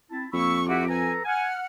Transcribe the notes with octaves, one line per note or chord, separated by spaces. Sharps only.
C4 E4 A5
F2 A#3 B5 C#6 E6
E4 F#4 G4 D6
A4 B4 G#5 A#5
F#5 G#5 F6